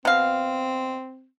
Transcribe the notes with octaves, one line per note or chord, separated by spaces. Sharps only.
B2 C4 F5